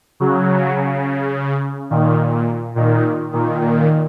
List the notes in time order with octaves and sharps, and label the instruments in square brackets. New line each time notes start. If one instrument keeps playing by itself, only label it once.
[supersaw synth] C#3 F#3
C#3
A#2 D#3
A#2
A#2 D#3
A#2 D#3
A#2 D#3